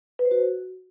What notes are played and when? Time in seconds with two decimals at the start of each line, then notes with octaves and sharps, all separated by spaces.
0.19 B4
0.25 C5
0.31 F#4